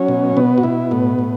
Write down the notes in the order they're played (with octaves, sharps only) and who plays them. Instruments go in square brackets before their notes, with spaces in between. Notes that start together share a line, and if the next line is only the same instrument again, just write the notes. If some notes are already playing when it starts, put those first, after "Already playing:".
Already playing: [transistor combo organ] F#3 C#4
B2
B2 B3
F#4
B2 E4
A2 B3
A2